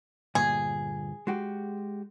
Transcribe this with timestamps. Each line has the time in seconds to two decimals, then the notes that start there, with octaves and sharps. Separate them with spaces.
0.35 D2 G2 A#2 G#4
1.27 G#3 F#4 G4